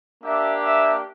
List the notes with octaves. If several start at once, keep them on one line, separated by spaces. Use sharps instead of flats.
A#3 D4 G4 E5
E5